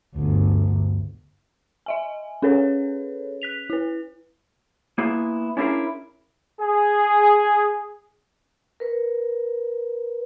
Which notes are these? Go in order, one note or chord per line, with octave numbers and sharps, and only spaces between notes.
G1 D2
D#5 E5 G#5
C#4 G#4 A4 B4 C#5
F#6 B6 F7
E4 B4
A#3 B3 E4 F4 G#4
C#4 D4 E4 F4 G#4 A#4
G#4
A#4 B4